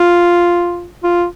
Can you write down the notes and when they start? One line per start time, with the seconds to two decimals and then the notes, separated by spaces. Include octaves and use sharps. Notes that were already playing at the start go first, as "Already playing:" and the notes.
Already playing: F4
1.03 F4